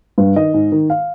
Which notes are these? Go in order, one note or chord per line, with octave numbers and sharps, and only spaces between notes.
G2
D#3 D#5
G#2
D#3
F5